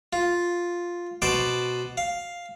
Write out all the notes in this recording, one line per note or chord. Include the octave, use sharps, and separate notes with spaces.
F4
B2 B4 C5 A5 D6
F5